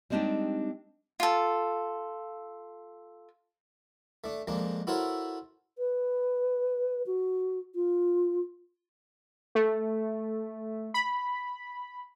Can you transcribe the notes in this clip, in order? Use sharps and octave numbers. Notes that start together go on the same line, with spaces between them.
G3 G#3 C4 D4 D#4 G4
F4 A4
A3 D4
F2 G#3 A#3 D4
E4 F#4 A4 A#4 C5 C#5
B4
F#4
F4
A3
B5